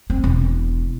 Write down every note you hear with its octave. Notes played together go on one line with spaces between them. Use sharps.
C4
E1